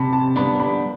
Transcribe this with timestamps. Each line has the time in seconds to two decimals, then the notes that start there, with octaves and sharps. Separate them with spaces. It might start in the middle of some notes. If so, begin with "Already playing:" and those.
Already playing: C3 A5 B5
0.13 A5
0.36 G3 B3 D4 B5
0.60 B5